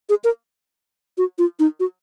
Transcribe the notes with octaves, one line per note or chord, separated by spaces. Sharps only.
G#4
A#4
F#4
F4
D#4
F#4